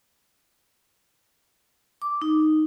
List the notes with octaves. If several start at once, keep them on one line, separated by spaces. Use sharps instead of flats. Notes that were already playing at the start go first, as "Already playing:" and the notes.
D6
D#4